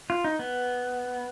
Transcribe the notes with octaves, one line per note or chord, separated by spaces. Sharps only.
F4
D#4
B3